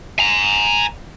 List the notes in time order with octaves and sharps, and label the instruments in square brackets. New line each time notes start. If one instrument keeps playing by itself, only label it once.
[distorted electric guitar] G#5 A#5